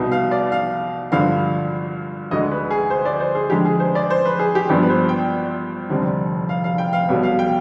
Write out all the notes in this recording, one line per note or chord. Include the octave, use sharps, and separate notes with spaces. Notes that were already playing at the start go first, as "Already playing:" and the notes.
Already playing: C2 B2 B3 D#4
F5
D5
F5
G#1 G2 D3 F3 F5
D2 D3 G#3 D#5
B4
G#4
C5
D5
C5
G#4
F2 D3 G#3 D4 G4
G#4
C5
D5
C5
B4
G#4
G4
G#1 G2 F3 B3 D4 G4
B4
C5
G5
F1 D#2 D3 G3 C4
F5
F5
G5
F5
B1 B2 G3 B3
F5
G5